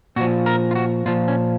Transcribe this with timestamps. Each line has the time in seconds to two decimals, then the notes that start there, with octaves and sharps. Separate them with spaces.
0.16 A#2 F#4
0.20 F3
0.46 A#4
0.71 F4
0.75 F#4
1.06 A#2 F3 F4
1.28 C#4